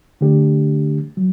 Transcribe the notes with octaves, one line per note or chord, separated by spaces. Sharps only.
D3 A3 D4 G4
F#3